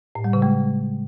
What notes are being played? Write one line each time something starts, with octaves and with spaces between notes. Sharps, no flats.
A2
G3
C#3
G#3